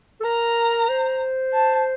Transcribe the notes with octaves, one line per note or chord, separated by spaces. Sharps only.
A4
A#4 A#5
C5
A5